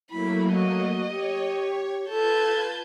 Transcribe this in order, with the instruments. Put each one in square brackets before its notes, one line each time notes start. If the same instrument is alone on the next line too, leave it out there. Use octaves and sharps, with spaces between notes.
[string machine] F#3 A3 A#3 [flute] E4 [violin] B5
[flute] F#4 [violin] D#5
[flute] G4 [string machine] C#5
[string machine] F4 B4 G#6 [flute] A4 [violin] A5 G6